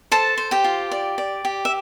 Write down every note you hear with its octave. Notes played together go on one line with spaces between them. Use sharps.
A4 C5 A5
C5
G4 G5
F4
D5
D5
G4
E5